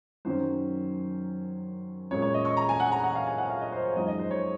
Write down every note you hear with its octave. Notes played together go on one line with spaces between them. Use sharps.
F#2 D#3 F#3 C#4 C5
A#2 G#3 C#4 C#5
C#5
D#5
C#6
A#5
G#5
F#5
A#5
F#5
F5
G#5
F#5
F5
D#5
C5
C#5
F#2 F3 G#3 D#4 D#5
D#5
C5
C#5